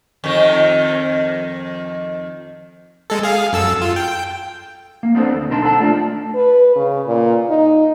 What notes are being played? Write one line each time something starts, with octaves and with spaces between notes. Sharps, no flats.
F2 D#3
G#3 A4
G#4 F5
F#2 A4 E6
F4
G5
A#3
B3 C4 D4 F#4 A4 C5
D2
B1 D4 D#4 A#4 A5 C6
A4 F#5 A5
A3 D4 F4 D5
B4
C#3
A#2
D#4